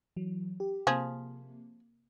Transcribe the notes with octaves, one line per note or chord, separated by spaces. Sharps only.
E3 F#3
G4
C3 F3 A#3 G#4